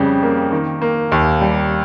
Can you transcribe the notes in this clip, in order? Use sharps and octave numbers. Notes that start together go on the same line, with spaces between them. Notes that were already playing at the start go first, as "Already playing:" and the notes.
Already playing: F2 C#3 G3
A#3
D#3
A#3
D#2
G3